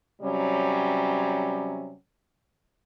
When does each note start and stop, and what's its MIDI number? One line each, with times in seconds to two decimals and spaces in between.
0.22 1.94 48
0.22 1.94 54
0.22 1.94 55
0.22 1.94 61